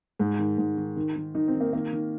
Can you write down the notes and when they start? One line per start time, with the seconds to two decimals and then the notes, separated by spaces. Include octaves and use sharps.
0.20 G#2
0.39 D#3
0.58 G#2
0.77 D#3
0.96 D#3
1.16 D#3
1.35 D#3 D#4
1.48 C4
1.54 D#3
1.61 A#3
1.73 D#3 A#3
1.93 D#3